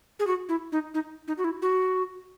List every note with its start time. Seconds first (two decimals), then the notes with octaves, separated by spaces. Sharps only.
0.19 G#4
0.27 F#4
0.49 E4
0.72 D#4
0.94 D#4
1.28 D#4
1.38 F#4
1.44 E4
1.62 F#4